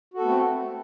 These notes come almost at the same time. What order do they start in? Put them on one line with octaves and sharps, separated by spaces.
F#4 A4 B3 A3 C4